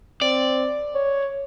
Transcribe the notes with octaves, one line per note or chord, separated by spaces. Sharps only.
C4 D5
C#5